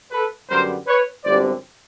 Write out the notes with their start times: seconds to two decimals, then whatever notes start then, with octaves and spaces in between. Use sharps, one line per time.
0.12 A4 B4
0.49 F#2 D3 G3 B3 A#4 C5
0.87 B4 C#5
1.25 G1 F#2 D3 G3 C4 C5 D5